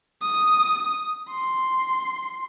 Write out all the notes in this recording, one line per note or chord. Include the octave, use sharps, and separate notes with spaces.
D#6
C6